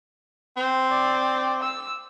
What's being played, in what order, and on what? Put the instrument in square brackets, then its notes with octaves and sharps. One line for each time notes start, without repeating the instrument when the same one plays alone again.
[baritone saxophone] C4
[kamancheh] D5
E6